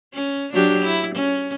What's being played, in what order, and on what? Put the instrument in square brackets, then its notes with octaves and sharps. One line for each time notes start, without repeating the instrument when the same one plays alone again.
[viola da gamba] C#4
F#3 D4 G4
E4
C#4